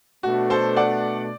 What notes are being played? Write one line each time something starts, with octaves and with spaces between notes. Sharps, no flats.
B2 A3 D4 F#4
A4 C5
D5 F#5